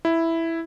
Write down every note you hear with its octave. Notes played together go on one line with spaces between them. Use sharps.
E4